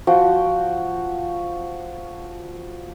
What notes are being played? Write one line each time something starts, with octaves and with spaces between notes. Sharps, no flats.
F3 F#4 F#5 G5